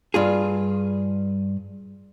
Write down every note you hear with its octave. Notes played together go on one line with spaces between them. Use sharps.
G2 F4 G#4